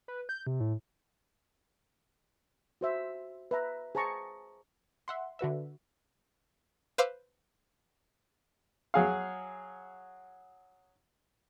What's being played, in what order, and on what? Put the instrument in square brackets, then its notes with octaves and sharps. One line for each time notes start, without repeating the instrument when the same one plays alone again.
[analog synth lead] B4
G6
C3
A2
[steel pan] F#4 C5 E5
B4 E5 A#5
G#4 C5 A5 A#5 C#6
[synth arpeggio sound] E5 F#5 C6
D3 F#4 B4 E5
[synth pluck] B4 C5 F5 D6 E6
[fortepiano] F#3 G#4 F5